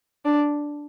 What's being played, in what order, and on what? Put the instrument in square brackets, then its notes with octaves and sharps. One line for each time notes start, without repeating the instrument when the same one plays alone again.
[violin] D4